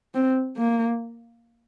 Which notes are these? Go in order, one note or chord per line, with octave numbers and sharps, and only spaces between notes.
C4
A#3